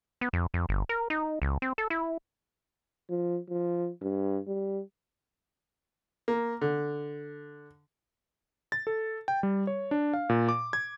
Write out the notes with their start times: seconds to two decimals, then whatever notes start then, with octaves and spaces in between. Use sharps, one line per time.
0.21 B3
0.33 F2
0.54 F2
0.69 G1
0.89 A#4
1.10 D#4
1.42 C#2
1.62 C4
1.78 A4
1.90 E4
3.10 F3
3.50 F3
4.02 G2
4.47 G3
6.28 A#3
6.62 D3
8.72 A6
8.87 A4
9.28 G5
9.43 G3
9.67 C#5
9.91 D4
10.14 F5
10.29 A#2
10.49 D6
10.73 G#6